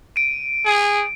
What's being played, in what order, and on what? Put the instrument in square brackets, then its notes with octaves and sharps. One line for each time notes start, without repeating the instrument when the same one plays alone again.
[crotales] D7 D#7
[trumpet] G#4